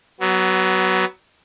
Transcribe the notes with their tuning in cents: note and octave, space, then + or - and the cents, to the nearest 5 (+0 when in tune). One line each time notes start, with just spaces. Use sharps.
F#3 +20 B3 +0